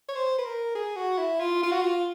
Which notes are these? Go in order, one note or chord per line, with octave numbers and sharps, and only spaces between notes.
C#5
C5
B4
A#4
G#4
F#4
E4
F4
F4
F#4
F4